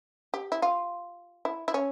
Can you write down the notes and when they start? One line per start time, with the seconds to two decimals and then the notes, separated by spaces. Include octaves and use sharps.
0.34 G4
0.52 E4
0.62 F4
1.45 E4
1.68 E4
1.74 C#4